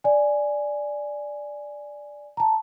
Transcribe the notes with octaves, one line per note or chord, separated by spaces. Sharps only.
D5 G#5
A5 A#5